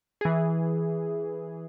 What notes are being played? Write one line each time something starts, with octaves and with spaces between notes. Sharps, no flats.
E3 G#4